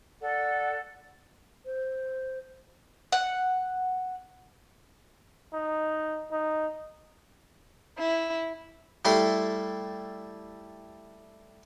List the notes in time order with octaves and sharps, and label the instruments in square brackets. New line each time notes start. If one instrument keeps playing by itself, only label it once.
[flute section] A4 D5 F#5
[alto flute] C5
[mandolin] F#5
[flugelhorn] D#4
D#4
[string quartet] E4
[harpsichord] G3 A3 E4 C6